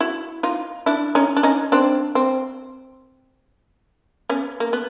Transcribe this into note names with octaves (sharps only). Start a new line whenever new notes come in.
E4 F#4
D#4 F4
D4 E4
C#4 D#4
D4
C#4 D#4
C4 D4
C4
B3 C#4
A#3
B3